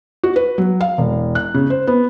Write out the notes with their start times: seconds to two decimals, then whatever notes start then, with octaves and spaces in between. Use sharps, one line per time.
0.23 F#4
0.36 B4
0.58 F#3
0.81 F5
0.98 E1
1.35 F#6
1.54 C#3
1.70 C5
1.87 B3